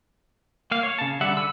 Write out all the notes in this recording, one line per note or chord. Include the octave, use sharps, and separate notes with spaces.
A#3 F5
C#5
C#3 A5
D3 G3 E5 F#5
D3 B5 E6